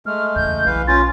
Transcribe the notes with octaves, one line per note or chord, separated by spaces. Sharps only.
G#3 A3 F6
E2 C#3 G6
B1 E3 B4 F5
C#4 F4 A6